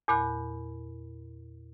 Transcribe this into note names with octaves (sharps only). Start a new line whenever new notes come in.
E2 A#2 B5 F#6